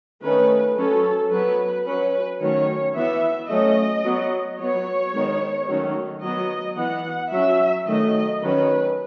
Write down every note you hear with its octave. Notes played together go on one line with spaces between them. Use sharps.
D#3 A3 C#4 B4
F#3 C#4 A4
F#3 B3 B4
F#3 C#4 B4
D#3 F#3 A3 C#4 C#5
E3 B3 E5
F#3 A3 C#4 D#5
F#3 B3
F#3 B3 C#5
D#3 G#3 B3
D#3 F#3 A3 C#4
F#3 B3 D#5
E3 B3 F#5
F#3 C#4 E5
D#3 F#3 A3 D#5
D#3 F#3 C#4 B4